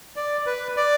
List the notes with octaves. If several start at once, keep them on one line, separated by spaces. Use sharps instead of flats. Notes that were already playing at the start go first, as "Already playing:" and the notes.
D5
B4
D5